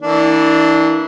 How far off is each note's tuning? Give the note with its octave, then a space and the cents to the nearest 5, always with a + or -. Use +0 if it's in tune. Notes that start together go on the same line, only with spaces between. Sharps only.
E3 -25 A#3 -20 D4 +0